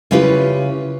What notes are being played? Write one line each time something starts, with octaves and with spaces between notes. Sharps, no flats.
C#3 C#4 E4 F4 G4 B4